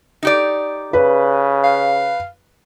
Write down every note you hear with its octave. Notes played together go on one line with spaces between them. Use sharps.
D#4 G4 D5
C#3 B4
F5